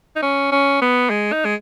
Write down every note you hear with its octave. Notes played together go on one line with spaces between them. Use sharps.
D#4
C#4
C#4
B3
G#3
D#4
G#3